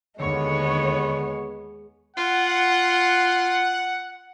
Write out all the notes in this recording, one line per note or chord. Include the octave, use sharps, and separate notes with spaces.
D#2 D3 G#3 B3 C#5
F4 F#5